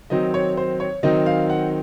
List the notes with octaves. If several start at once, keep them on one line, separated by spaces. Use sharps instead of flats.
D#3 F#3 C4 D#4 D#5
C#5
C5
C#5
D#3 F#3 C4 D#4 D#5
F5
F#5